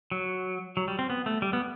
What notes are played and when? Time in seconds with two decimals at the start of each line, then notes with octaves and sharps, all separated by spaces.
0.11 F#3
0.77 F#3
0.88 G3
0.99 C4
1.10 B3
1.26 A3
1.42 G3
1.53 B3